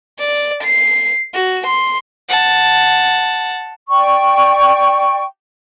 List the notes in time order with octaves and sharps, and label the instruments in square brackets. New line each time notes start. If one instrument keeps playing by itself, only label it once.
[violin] D5
C7
F#4
C6
[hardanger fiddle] F#5 A5
[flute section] D5 G5 C#6